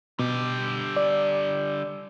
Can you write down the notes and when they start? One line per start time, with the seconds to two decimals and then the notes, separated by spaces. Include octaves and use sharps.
0.19 B2 D3 G3
0.97 D5